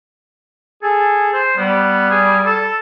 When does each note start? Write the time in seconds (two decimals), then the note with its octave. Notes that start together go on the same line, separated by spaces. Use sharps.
0.83 G#4 A4
1.33 C5
1.57 G3 B3
2.10 G#4
2.46 A4